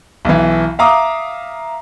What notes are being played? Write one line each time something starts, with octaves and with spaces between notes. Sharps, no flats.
B1 E3
E5 F5 A#5 D6 D#6